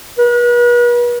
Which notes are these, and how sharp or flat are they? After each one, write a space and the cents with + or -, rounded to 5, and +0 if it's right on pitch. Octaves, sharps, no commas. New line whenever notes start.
B4 -40